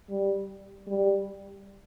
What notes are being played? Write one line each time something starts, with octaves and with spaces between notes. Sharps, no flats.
G3
G3